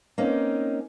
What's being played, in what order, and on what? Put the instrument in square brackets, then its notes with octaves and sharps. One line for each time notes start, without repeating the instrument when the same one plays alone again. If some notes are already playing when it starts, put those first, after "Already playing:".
[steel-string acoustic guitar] A#3 C4 C#4 D#4